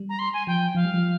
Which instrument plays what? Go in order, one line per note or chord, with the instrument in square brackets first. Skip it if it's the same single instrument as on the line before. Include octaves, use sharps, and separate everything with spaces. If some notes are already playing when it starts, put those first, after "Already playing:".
Already playing: [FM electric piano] G3
[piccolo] A#5
C6
G#5
[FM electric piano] F3 [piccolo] G5
[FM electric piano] F3 [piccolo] F5
[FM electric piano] G3
F3